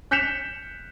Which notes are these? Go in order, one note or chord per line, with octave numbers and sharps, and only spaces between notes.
F#6 G6 B6 C#7 E7 F7